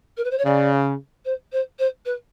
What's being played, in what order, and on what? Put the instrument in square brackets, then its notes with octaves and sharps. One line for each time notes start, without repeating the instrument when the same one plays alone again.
[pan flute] A#4
B4
C5
C#5
[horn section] C#3 [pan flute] D5
[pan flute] C5
C5
C5
B4